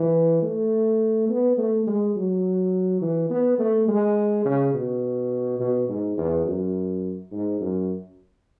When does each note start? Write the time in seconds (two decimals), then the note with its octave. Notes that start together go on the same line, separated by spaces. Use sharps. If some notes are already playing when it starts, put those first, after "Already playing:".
Already playing: E3
0.43 A3
1.29 B3
1.58 A3
1.87 G#3
2.16 F#3
3.01 E3
3.30 B3
3.59 A3
3.88 G#3
4.45 C#3
4.74 B2
5.60 B2
5.89 G#2
6.18 E2
6.45 F#2
7.32 G#2
7.61 F#2